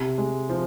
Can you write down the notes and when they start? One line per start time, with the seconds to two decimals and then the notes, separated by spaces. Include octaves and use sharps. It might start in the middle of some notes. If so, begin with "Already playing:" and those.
Already playing: C3
0.18 G#3
0.49 F3